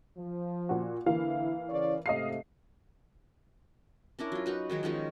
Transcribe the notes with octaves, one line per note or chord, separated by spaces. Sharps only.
F3
A#2 F#4
D3 E3 A#3 E4 F5
C#3 C#5 D5
G#2 C3 A3 D#5 F5 C7
C#4 D4 E4 A#4
F#3 F4
D#4 F#4 B4
D#3 F#3 G#3 C#5
D#3 F3 G#3 C#4